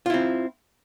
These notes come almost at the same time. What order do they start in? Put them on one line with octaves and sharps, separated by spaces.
F4 E4 C4